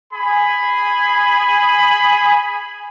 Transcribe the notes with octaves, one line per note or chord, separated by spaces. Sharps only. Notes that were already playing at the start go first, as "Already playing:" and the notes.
G#4 G#5 B5